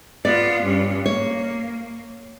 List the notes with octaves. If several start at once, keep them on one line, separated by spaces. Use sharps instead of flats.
B3 F4 D5
G2 C#4
A#3 C#5